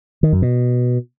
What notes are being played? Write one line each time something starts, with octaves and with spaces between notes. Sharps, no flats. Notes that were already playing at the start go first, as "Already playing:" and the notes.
D#3
F#2
B2